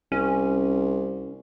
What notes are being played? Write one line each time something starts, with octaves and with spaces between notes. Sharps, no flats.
C2 C#4